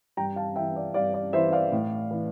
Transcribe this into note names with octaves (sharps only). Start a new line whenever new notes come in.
G2 G5 A#5
F5 A5
E3 E5 G5
D5
G2 D5 F5
D5
E3 C5 E5
D5 F5
A2
E3